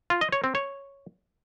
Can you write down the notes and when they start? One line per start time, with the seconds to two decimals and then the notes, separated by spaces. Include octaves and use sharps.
0.10 F4
0.21 D#5
0.32 C#5
0.44 C4
0.55 C#5